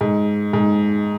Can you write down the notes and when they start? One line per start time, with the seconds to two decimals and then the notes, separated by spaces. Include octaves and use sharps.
0.01 G#2
0.53 G#2